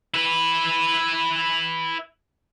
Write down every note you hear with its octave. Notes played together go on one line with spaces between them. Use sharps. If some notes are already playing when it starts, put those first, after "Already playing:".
E4 B4